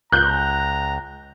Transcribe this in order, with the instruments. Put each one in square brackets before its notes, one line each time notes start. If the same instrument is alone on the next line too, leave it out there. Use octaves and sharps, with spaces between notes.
[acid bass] C#2 [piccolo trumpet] A#5 [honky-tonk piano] F#6 G6